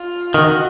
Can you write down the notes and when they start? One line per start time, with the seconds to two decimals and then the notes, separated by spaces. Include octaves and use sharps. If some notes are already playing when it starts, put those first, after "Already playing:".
Already playing: F4
0.34 D#3 F#4